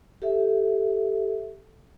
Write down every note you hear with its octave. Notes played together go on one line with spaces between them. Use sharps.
G4 A4 E5